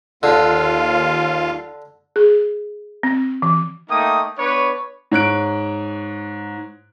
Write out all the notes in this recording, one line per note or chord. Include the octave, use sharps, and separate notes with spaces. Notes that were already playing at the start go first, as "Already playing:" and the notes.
D#2 D3 F4 F5
G#4
C4
E3
A3 A#3 D#4 G5 D#6
B3 D4 B4 C#5
G#2 C#5 F#6 D7